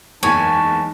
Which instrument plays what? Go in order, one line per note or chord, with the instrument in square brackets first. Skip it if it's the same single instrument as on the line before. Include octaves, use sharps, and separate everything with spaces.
[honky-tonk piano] F#1 E2 [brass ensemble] E3 G#3 D#4 [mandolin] C#4 G#5 [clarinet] A5